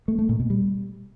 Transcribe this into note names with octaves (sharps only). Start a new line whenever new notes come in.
A3
A3
A#2
B2
G3